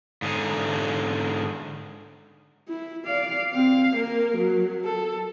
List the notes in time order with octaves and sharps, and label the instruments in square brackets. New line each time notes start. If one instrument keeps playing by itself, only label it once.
[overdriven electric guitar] G#2 D3
[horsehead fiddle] E4
D5 F5
C4 F5
A#3 A#4
F#3
A4